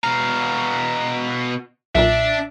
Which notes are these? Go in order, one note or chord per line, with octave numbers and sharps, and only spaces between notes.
B2 F5 A#5
B1 A#2 D4 E5